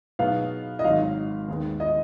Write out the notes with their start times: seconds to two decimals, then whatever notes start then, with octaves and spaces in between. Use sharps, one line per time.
0.19 B2 F#3 B3 D#4 G#4 F5
0.79 D#5
0.84 G#1 G#2 D#3 F#3 F5
1.48 D#2 D#3 G#3 B3
1.80 D#5